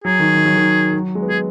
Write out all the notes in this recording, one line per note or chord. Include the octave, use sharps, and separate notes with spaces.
F#3 G#4
D#3
D#3
F#3
D#3
F#3
G#3
B3
G#3 G#4